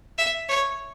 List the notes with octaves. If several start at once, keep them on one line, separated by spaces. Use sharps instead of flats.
E5
C#5